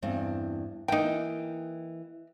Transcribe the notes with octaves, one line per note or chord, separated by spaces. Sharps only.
E2 G2 C4
E3 A#3 D#4 G5